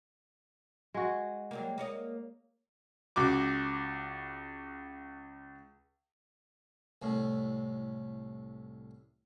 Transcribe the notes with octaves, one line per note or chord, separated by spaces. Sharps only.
G#3 F#4
F#3 G3 A#3
A#3 C#5 D#5
C#2 F#4 D6
C2 A2